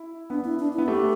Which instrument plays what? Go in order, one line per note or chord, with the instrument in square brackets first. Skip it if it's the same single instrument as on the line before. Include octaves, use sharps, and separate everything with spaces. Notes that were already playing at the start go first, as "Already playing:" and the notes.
Already playing: [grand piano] E4
[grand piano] B3 [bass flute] D4
[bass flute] E4
D4
E4
[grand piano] B3
[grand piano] A3 [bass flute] G4